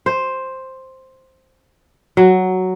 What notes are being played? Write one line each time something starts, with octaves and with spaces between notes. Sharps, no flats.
C5
F#3